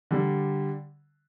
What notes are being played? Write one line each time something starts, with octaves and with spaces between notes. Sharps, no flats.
D3 G3